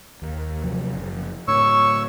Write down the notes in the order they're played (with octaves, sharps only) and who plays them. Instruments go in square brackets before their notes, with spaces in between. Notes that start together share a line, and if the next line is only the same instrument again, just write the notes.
[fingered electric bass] D#2
C3 F3 F#3
F#1
[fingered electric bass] A2 D3 [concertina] C#5 C#6 E6